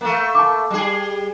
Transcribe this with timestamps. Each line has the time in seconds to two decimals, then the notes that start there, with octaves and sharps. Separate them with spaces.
0.01 A3 A#3
0.35 A5 D6
0.70 G3 G#4